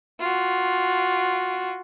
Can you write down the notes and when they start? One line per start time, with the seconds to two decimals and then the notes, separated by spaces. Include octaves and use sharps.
0.20 F4 F#4